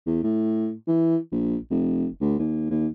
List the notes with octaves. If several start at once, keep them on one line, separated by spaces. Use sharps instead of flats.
E2
A2
E3
A#1
F1
D2
D#2
D#2